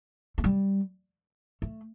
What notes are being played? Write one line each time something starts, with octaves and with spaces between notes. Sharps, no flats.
A3
G3
A3